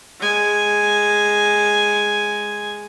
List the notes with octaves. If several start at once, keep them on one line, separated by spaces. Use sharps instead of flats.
G#3 G#5